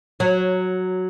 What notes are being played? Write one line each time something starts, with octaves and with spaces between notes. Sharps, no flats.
F#3